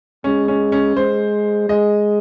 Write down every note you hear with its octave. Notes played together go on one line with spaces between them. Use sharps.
G#3 C#4
C#4
C#4
G#3 C5
G#3 D#5